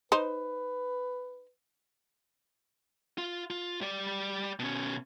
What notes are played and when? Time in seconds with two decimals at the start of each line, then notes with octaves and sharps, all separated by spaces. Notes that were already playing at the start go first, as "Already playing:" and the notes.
0.12 D#4 B4 C5
3.18 F4
3.50 F4
3.81 G3 D5
4.59 B2 C#4